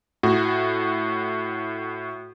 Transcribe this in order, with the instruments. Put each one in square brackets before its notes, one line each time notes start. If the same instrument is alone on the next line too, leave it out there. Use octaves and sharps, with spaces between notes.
[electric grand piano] A2 F#4